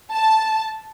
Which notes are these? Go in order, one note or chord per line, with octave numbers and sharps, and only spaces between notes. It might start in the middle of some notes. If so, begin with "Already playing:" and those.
A5